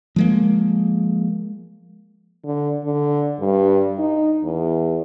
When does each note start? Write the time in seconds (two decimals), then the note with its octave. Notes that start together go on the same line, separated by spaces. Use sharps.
0.16 F3 G#3 A#3
2.44 D3
2.84 D3
3.39 G2
3.98 D#4
4.43 E2